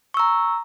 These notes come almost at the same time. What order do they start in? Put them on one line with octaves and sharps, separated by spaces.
C#6 E6 A#5